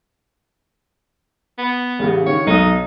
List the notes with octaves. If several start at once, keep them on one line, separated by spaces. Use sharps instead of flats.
B3
A1 C#3 G4
D#3 C#5
B1 D#4 D#6